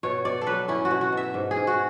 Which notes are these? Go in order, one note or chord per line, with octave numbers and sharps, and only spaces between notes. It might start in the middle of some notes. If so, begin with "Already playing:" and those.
B2 C#5
B2 D5
A4
F#3 B4
C#4 E4
F#4
B2
F#4
B2 E5
G#2
G#4
G#2
F#4